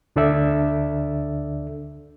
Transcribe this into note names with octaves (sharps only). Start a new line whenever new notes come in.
D2 D3 D4 A4 D5 E5